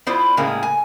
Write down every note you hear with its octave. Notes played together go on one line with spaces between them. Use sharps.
B3 E4 F4 C5 D5
A2 C#3 G#3 A#3
G#5